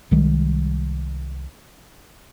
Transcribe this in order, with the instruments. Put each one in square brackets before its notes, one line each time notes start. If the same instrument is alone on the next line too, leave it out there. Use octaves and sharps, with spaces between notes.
[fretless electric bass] C2 D#3 G3 G#3